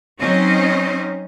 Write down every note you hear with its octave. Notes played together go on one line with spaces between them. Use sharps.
F#3 C4 C#4 D#4 C5 D#5